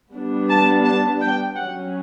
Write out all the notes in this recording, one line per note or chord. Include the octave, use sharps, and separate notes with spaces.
G3 B3 D4
A5
A5
G5
F#3 C#4 F#5